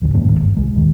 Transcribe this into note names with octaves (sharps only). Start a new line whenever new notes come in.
A1 E2 D3
G#2 G#3 A#3 C#4
D#1 G#1 D#3
G1
C2 G#3
D#1 D#3